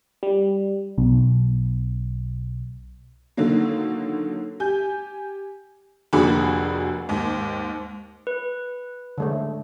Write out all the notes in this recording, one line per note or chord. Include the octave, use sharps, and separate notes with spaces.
G3
B1
D3 D#3 F#3 A#3
G4 G#5 G6
F1 D3 A#3 F#4 G#4 B5
D#2 G#2
B4
D3 G#3 A3